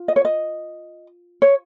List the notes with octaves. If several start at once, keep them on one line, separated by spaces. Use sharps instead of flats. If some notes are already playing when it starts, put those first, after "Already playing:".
Already playing: F4
D#5
C#5
D#5
C#5